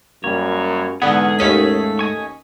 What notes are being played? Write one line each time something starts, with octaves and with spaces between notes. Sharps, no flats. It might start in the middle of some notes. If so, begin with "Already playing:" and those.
F#2 G3 A#3 C#5
E2 G#2 D3 B3 G#4 F#5
D#2 A3 C#4 B6
D#5 G#5 C#6